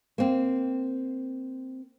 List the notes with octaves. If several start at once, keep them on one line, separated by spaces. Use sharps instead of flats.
A#3 C4